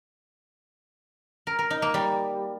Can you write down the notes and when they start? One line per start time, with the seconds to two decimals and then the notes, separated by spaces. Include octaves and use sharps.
1.47 A#4
1.59 A#4
1.70 D#4
1.82 A#3
1.94 G3